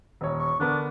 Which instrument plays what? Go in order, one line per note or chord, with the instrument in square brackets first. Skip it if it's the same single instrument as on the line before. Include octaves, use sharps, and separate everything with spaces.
[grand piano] D#1 C#5
[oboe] C#6
[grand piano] D3 B3 A#4 [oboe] D4